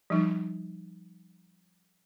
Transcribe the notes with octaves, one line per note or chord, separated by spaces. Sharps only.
F3 G3 D#4